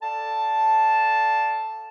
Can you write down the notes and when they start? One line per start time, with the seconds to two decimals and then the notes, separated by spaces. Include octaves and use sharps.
0.02 A4 D5 F5 A5